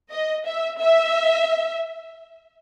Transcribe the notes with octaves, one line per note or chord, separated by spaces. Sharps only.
D#5
E5
E5